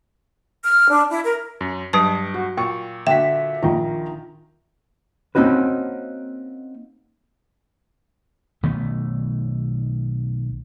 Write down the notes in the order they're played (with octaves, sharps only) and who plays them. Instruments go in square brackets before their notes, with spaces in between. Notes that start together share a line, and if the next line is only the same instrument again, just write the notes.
[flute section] F6
D4
E4
A#4
[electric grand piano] F#2
[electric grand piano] G2 D7 [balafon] F#3 B4 A5
[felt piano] F#4
[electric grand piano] A#2 [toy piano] G5 [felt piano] C#6
[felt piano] D3 F#4 B6 [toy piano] E5 [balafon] G5
[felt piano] A#1 D#3 A#5 [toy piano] F4
[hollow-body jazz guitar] A#3 C4 C#4 D#4 F#4 B4
[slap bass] B1 D#3 A3 B3